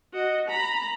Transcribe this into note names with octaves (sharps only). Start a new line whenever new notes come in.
F#4 D#5
A#5 B5